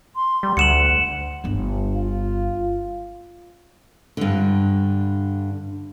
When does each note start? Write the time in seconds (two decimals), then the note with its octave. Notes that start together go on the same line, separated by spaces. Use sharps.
0.16 C6
0.43 G3
0.57 D2 F#5 C#7 E7 F#7
1.44 G1 B3
1.95 F4
4.17 G2 D3